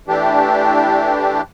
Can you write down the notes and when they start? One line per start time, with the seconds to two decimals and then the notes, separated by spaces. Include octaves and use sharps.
0.08 E3 A3 D4 G4